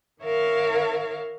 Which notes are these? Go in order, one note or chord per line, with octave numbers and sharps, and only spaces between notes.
D#3 A#4 C#5 E5 F5